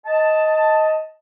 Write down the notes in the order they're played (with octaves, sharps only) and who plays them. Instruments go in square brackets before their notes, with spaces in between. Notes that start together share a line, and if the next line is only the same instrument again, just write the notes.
[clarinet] D#5 [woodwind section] A5